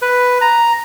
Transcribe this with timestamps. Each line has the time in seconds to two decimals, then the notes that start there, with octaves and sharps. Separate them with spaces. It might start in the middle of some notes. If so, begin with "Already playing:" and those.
0.02 B4
0.41 A#5